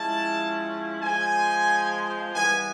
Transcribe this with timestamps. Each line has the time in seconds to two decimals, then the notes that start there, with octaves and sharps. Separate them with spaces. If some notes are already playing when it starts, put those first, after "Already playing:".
Already playing: F3 G#3 C#4 E4 A5
1.02 F3 G#3 C4 G#5
2.33 E3 G3 B3 G#5